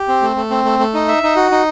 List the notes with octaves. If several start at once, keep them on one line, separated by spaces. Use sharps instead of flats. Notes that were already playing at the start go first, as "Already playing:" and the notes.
Already playing: G4
C4
A3
A3
C4
A3
A3
D#4
E5
D#4
F#4
D#4